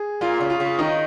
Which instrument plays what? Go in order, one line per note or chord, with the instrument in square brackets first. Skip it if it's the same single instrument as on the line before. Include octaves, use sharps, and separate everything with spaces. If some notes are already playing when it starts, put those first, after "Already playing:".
Already playing: [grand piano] G#4
[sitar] A#2 [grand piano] F4
[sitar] C#3
[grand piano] F4
[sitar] C#3
[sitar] D#3 [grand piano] D#4